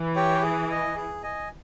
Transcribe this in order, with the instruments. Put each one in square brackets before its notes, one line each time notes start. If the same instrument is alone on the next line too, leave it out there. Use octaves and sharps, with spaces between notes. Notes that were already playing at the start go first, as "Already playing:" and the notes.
Already playing: [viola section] E3
[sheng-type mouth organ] G4 C#5 G5
G#4
D#5 G#5
G#4
D#5 G#5